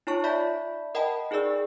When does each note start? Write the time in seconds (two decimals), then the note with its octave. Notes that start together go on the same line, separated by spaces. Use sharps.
0.07 D#4 F4 C#5 A5 C#6
0.24 D5 E5 A5 B5 G6 B6
0.95 A#4 D#5 F#5 G5 A5 B5
1.31 D#4 G#4 A#4 D5 E6